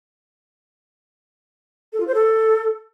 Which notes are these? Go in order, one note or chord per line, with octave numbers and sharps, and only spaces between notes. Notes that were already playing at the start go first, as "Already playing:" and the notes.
A4
F4
C5
A4